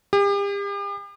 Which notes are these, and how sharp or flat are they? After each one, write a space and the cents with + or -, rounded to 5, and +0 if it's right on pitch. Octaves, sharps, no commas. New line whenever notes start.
G4 +40